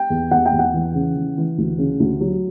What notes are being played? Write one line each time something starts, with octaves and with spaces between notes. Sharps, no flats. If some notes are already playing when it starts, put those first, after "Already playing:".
Already playing: G5
E2
E2 F#5
G5
E2
F#5
E3
C#3
E3
E3
D2
C#3
D2
F#3